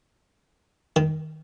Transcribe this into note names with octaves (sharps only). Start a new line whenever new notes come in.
D#3